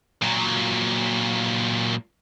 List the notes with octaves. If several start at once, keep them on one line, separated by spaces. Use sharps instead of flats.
A#2 F#3